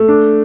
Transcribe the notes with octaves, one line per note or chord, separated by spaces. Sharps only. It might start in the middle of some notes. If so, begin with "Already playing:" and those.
Already playing: A3
D4